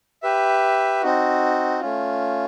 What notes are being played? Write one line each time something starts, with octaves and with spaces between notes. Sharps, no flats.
G4 B4 E5
C4 D#4 F#4
A3 C#4 F4